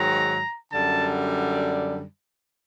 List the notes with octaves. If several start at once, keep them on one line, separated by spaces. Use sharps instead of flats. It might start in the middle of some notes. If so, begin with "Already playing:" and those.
Already playing: G#2 D#3 F#3 A#5
F#2 D3 G3 A5